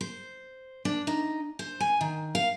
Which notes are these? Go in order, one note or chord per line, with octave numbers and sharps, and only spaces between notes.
C5
D4
D#4
C5
G#5
D#3
F5